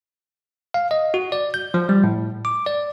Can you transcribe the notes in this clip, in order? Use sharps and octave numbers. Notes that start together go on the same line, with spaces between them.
F5
D#5
F#4
D5
G6
F3
G3
A2
D6
D5